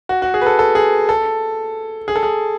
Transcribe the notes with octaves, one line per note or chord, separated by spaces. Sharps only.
F#4
F#4
G#4
B4
A4
A4
G#4
A4
G#4
A4
G#4